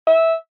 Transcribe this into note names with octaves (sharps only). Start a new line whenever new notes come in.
E5